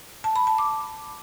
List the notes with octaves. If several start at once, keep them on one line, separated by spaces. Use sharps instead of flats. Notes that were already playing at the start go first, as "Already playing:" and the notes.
A5
B5
A5
D6